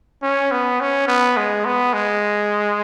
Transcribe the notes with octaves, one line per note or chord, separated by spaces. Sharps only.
C#4
B3
C#4
B3
G#3
B3
G#3